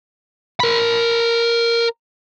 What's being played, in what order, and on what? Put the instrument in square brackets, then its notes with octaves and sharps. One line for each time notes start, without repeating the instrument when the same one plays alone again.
[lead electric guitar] A#4 B5